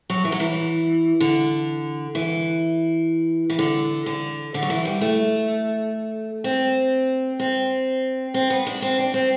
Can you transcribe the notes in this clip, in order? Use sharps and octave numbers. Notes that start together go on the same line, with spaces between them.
F#3
E3
F#3
E3
D3
E3
E3
D3
D3
D3
F#3
E3
G3
A3
C4
C4
C4
B3
D4
C4
D4
C4